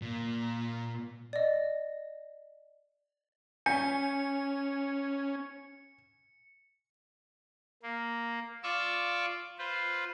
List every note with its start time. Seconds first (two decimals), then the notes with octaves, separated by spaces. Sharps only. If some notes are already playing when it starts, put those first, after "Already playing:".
0.02 A#2
1.33 D5 D#5
3.66 C#4 G#5 G6 B6 C#7
7.83 A#3
8.63 F4 D5 C#6 D6 E6
9.58 F4 B4 C5